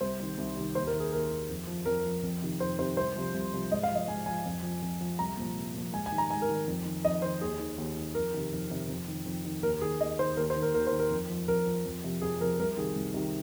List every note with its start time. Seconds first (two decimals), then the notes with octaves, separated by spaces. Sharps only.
0.01 C2 C5
0.20 C3 D#3
0.38 C2
0.57 C3 D#3
0.75 D#2 C5
0.87 A#4
0.93 D#3
1.00 G#4
1.12 D#2 A#4
1.31 D#3
1.49 F2
1.67 F3
1.86 F2 A#4
2.05 F3
2.23 F2
2.42 C3 D#3
2.60 F2 C5
2.79 C3 D#3 C5
2.97 C2 C5
3.16 C3 F3
3.34 C2
3.53 C3 F3
3.71 G#2 D#5
3.83 F5
3.90 F3
3.95 D#5
4.08 G#2 G#5
4.26 F3 G#5
4.45 F2
4.63 F3
4.82 F2
5.01 F3
5.19 C2 A#5
5.37 A#2 F3
5.56 C2
5.74 A#2 F3
5.93 G#2 G#5
6.06 G#5
6.12 D#3
6.18 A#5
6.30 G#2 G#5
6.42 A#4
6.49 D#3
6.67 F2
6.85 D#3
7.05 F2 D#5
7.22 D#3 C5
7.41 D#2 G#4
7.60 D#3
7.78 D#2
7.97 D#3
8.15 F2 A#4
8.34 C3 D#3
8.53 F2
8.70 C3 D#3
8.89 F2
9.08 D#3
9.26 F2
9.45 D#3
9.63 D#2 A#4
9.81 D#3 G#4
10.00 D#2 D#5
10.19 D#3 C5
10.37 D#2 A#4
10.50 C5
10.56 D#3
10.62 A#4
10.74 D#2 A#4
10.87 C5
10.92 D#3
10.99 A#4
11.11 F2
11.30 F3
11.48 F2 A#4
11.66 F3
11.85 F2
12.04 C3 F3
12.21 F2 G#4
12.41 C3 F3 A#4
12.59 C2 A#4
12.77 C3 D#3 G#4
12.95 C2
13.14 C3 D#3